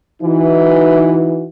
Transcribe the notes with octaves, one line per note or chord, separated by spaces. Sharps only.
E3 D#4 F#4